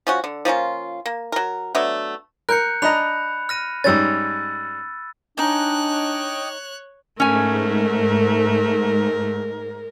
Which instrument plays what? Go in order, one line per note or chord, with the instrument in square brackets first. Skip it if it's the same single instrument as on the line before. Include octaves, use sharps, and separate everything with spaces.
[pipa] F3 C#4 F#4
D3
F3 A#3 C#4 F4
A#3
F#3 A#4
F#3 A3 B3 D4
[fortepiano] A#4 [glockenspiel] F#6 G6 C#7
[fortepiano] D4 D#5 A#5 [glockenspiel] B5 F#6 F7
[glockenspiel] F6 A#6 D#7
[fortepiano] G#2 G3 C#4 [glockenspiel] E6 G#6 A6
[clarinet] D4 [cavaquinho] D#4 G#5 [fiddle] C#5 F#6 [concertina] D#5 G5 D6
[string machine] G#2 [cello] A3 [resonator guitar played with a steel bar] C#4 G#5 [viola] A#4